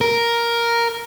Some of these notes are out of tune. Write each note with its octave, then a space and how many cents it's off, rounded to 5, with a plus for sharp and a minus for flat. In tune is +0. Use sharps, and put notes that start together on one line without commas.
A#4 +5